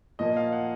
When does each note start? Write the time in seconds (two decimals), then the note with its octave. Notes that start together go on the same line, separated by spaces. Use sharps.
0.19 A#2 F3 A#3 D#5
0.37 F5
0.53 F#5